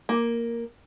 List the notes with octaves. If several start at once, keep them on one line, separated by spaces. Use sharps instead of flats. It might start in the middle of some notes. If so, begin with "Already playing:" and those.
A#3